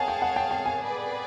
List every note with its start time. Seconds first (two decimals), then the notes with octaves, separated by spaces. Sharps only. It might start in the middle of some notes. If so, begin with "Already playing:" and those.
Already playing: G#4 C#5 F5 F#5 G#5 A5
0.08 G5
0.22 F#5
0.36 G5
0.51 G5
0.66 G#5
0.79 G#4 B4 D5